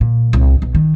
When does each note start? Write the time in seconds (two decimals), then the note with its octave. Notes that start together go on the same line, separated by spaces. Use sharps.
0.01 A#2
0.33 C2
0.62 B1
0.75 D#3